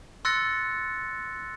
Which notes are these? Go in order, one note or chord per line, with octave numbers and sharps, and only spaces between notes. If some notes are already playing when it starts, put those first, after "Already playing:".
C6 E6 F#6 A6 A#6 C#7